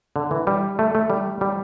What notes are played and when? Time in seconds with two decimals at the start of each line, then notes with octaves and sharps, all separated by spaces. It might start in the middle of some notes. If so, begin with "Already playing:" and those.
0.16 D3
0.31 E3
0.47 G3
0.79 A3
0.95 A3
1.10 G3
1.41 G3